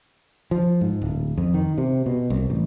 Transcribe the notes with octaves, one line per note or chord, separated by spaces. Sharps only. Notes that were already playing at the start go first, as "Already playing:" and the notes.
F3
G#2
D1
F2
D#3
C3
B2
C2
A1